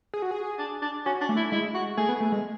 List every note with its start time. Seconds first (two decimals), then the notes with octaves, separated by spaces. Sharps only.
0.14 G#4
0.22 F#4
0.31 G#4
0.59 D4
0.82 D4
1.06 C#4 F#4
1.21 D4
1.29 A3
1.37 E4
1.52 G#3 E4
1.74 F#4
1.97 A3 G#4
2.09 B3
2.20 A3
2.32 G#3